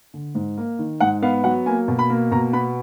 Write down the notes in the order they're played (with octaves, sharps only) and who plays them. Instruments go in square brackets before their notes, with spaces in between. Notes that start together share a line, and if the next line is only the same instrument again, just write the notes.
[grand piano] D3
G#2
A#3
D#3
G#2 F#5
B3 F5
F#3 F#5
A#3 G#5
B2
B5
A#3
B2 A#5
B3 B5